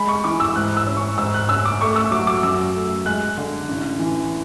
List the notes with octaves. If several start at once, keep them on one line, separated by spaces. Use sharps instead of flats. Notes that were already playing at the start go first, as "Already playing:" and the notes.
Already playing: G#3 B5
C#6
E3 D6
E6
G#2 F#6
E6
C#4
C#6
G#2 E6
F#6
C#4 E6
D6
A3 C#6
E6
F#3 D6
D6
F#2 E6
A3
G#3 F#6
D3
A1
E3